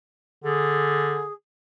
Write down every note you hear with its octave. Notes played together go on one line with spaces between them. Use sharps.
D3 G#4